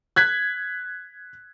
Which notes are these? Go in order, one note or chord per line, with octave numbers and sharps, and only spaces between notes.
F#6 G#6 B6